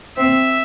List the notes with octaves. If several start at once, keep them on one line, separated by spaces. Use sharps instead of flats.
C4 E5